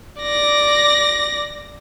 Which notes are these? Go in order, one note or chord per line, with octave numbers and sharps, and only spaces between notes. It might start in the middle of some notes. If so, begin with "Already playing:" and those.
D5 A#6